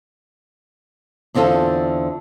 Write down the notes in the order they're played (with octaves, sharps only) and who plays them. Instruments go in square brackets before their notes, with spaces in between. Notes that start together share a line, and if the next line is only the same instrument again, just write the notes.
[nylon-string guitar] E2 D3 C4 F4 A4 E5